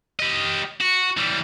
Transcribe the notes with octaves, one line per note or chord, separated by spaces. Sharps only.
G4 D#5
F#4
E3 G3